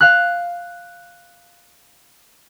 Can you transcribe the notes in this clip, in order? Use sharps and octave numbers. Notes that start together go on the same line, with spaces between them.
F5 F#6